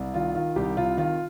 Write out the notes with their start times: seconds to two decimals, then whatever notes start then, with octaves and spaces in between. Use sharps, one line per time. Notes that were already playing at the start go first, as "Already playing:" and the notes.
Already playing: C2
0.14 D#3 F4
0.35 D#3 F4
0.56 C2 G4
0.77 C3 F4
0.97 D#3 F4